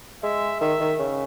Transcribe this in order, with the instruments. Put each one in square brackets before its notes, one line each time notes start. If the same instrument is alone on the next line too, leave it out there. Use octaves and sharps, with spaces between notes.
[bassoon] G#3 [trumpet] E5
[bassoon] D#3 [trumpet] E5
[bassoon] D#3
C#3